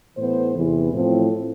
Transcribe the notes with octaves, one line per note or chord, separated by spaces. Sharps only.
A2 E3 B3 C5
E2 C3 E3
A2 F3 C4